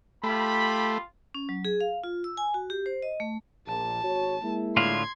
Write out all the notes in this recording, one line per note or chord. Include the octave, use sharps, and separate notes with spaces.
A3 F4 G4 B5
C#4
F#3
G#4
F5
F4
E6
G#5
F#4
G4
C5
D#5
A3
A#1 A#2 A5
G#1 F#4 C#5
G#3 A#3 E4
A2 D3 F4 C6 G#6